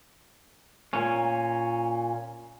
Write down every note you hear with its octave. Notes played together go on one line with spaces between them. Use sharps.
A#2 C#4